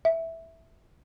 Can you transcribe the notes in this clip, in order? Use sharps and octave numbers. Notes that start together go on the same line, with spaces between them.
E5